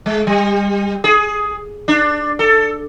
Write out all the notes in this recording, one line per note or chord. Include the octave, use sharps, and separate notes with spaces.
G#3
G3
G#4
D4
A4